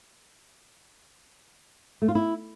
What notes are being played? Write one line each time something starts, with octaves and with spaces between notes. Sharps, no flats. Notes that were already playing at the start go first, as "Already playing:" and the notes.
A3
F4
E4